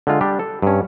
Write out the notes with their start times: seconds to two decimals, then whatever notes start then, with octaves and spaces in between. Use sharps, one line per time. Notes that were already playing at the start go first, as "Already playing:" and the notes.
0.07 D3 G#3 F4
0.21 G3 D4 G4
0.39 A4
0.62 G2 C#4